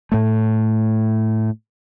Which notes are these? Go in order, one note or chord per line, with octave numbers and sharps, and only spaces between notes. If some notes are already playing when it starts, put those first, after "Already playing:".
A2 A3